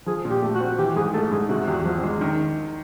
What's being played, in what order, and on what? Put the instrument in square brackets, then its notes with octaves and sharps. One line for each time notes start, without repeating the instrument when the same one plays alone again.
[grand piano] F3 [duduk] G#4
[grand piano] A#2
[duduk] G4
[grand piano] A3
[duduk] F#4
[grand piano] C4
[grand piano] E3 [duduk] G4
[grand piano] G#2 [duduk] G#4
[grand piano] A3 [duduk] A4
[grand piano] G#2 [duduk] G#4
[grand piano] C3 [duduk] F#4
[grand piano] E2 [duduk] G4
[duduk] F#4
[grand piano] F3
[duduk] C4
[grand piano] G#3
[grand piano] D#3 [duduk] C#4